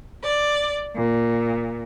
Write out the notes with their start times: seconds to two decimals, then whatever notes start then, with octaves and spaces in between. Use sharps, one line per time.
0.22 D5
0.96 A#2